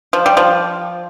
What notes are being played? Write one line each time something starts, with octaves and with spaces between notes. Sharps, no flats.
F3
G3
F3